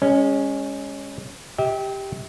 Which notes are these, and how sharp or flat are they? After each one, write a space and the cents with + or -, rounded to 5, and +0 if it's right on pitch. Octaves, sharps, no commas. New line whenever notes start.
G#3 -30 C#4 +0
G4 +0 E5 -40